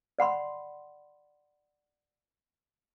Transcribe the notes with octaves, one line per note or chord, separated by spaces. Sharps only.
D5 F#5 B5 C6